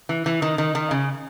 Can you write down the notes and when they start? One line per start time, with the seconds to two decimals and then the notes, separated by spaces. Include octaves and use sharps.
0.09 E3
0.26 E3
0.42 D#3
0.58 D#3
0.75 D#3
0.91 C#3